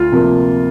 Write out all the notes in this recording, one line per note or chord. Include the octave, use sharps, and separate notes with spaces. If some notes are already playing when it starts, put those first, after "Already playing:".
Already playing: D2 F4
C3 F3 A#3